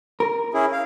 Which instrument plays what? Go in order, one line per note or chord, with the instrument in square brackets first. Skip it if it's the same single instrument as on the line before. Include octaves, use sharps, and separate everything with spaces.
[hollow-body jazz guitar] A#4
[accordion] C#4 E4 G#4
F5